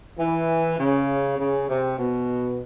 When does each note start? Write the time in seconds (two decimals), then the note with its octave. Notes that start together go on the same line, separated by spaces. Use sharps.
0.19 E3
0.79 C#3
1.39 C#3
1.70 C3
1.99 B2